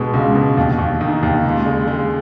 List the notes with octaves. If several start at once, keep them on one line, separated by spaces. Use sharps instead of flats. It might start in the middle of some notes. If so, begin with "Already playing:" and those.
Already playing: B2 G#3
C#2
B2
D#2
D#2
D#3
D#2
C#2
G#3
G#3